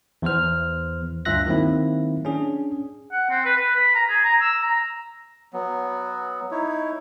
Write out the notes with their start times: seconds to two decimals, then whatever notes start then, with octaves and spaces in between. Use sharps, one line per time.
0.22 E2 E3 C5 F6
1.25 D2 G2 F4 E5 F#6 A#6
1.46 D#3 F#3 A#3 C4 E4
2.25 C#4 D4 G#4
3.12 F#5
3.30 C4
3.45 B4
3.57 B4
3.75 B5
3.95 A#5
4.09 G#4
4.24 A#5
4.41 E6
4.62 A#5
5.53 F#3 B3
6.51 D#4 E4 C#5